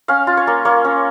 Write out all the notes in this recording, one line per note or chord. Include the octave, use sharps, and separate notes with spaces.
C#4 F5
F4
C#5
A#3
A#3 C#5
C#4